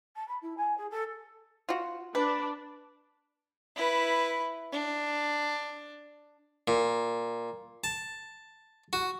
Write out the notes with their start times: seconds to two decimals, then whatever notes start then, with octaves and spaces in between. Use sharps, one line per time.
0.16 A5
0.28 B5
0.42 E4
0.57 G#5
0.77 G#4
0.90 A4
1.69 F4 F#4
2.15 D4 B4
3.76 E4 B4
4.72 D4
6.68 A#2
7.84 A5
8.93 F#4